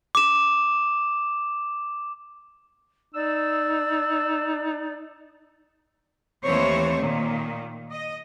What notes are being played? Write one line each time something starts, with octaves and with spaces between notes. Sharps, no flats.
D6 E7
D#4 D5 E6
D#2 E3 A3 C4 C5 C#5
A#2 D#3
D#5